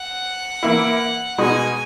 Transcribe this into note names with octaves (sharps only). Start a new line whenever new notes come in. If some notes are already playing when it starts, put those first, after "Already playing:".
Already playing: F#5
E3 A#3 E4
B2 G#3 D#4 F#4 G#5